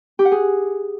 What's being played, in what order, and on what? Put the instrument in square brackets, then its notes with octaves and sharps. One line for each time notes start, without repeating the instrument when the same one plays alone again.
[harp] G4
F#5
G#4